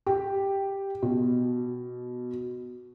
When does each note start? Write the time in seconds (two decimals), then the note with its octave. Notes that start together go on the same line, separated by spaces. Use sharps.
0.06 G4
1.03 B2